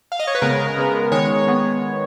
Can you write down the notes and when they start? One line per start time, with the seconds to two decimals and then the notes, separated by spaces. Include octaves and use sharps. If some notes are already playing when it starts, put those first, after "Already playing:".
0.12 F5
0.20 D#5
0.27 C#5
0.35 B4
0.42 C#3 G#3 B3 A#4
0.77 C#3 G#3 B3
1.12 D#3 G#3 B3 C#5
1.47 D#3 G#3 B3